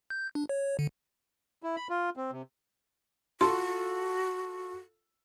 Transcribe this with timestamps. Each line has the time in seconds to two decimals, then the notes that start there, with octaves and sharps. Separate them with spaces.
0.10 G6
0.35 D4
0.49 C#5
0.79 D3
1.63 E4
1.76 B5
1.90 F4
2.17 C4
2.32 C3
3.41 F4 F#4 A4 C6